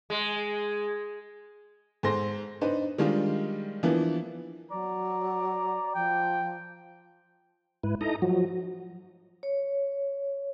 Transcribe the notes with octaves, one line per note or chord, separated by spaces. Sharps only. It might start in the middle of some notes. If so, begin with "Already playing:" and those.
G#3
G#2 A4 C5 C6 A#6
D4 D#4 B4 C5
D#3 G3 G#3 D4 F4
E3 F3 A#3 B3 D4 E4
F#3 D5 A#5
F3 G5
G#2 E4 B4
D#4 E4 A4 A#5 D#6
F3 F#3 F#4
C#5